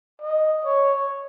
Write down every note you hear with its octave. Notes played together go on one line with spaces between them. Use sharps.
D#5
C#5